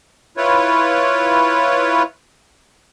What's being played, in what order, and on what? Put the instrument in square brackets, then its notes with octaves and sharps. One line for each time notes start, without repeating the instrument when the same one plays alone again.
[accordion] E4 F4 B4 C#5